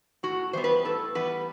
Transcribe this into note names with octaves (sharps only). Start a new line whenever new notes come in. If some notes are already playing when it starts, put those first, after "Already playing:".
A2 F#4
E3 G3 B3 C5
B4
A2 A4
E3 G3 B3 B4